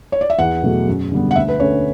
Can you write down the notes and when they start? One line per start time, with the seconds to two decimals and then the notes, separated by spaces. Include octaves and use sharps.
0.12 C#5
0.21 D5
0.30 E5
0.39 E2 F#5
0.63 B2 F#3 A3
0.88 F#2
1.12 D3 G3 B3
1.31 F#5
1.36 D2 E5
1.48 B4
1.60 D3 A3 C#4 C#5